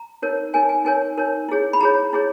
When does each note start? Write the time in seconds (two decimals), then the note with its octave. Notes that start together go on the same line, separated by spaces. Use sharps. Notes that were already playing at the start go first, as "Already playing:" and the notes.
Already playing: A#5
0.22 D#4 A#4 C#5
0.53 D#4 A#4 C#5 G#5
0.69 G#5
0.85 D#4 A#4 C#5 G#5
1.18 D#4 A#4 C#5
1.48 E4 G#4 C#5
1.73 B5
1.81 E4 G#4 C#5 A#5
2.13 E4 G#4 C#5